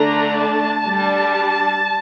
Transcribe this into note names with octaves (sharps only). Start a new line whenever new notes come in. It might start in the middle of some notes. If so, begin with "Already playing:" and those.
Already playing: D3 A3 D4 A#5
A5
G3 D4